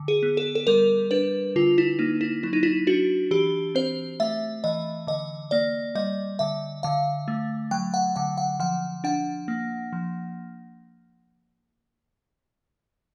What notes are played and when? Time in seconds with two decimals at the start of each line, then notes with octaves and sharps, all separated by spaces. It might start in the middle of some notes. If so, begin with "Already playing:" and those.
Already playing: D3
0.08 G#4
0.23 B3
0.37 A4
0.55 A4
0.67 G3 A#4
1.11 D4 B4
1.56 D3 F4
1.78 E4
1.99 A#3 D#4
2.21 E4
2.43 F#3 E4
2.53 D#4
2.63 E4
2.87 D4 F#4
3.31 E3 G4
3.75 C4 C5
4.20 A3 E5
4.64 E3 D#5
5.07 D3 D#5
5.51 A#3 D5
5.95 G3 D#5
6.39 D3 E5
6.83 D3 F5
7.28 A3
7.71 F#3 G5
7.94 F#5
8.16 D3 F#5
8.37 F#5
8.60 F3 F#5
9.04 D4 F#5
9.48 A#3
9.93 F3